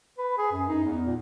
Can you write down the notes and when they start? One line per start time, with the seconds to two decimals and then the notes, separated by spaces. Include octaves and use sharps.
0.18 B4
0.38 G#4
0.52 F#2
0.69 D#4
0.84 E2
1.07 A#2